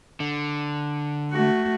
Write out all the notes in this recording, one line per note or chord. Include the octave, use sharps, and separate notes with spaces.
D3
A3 F#4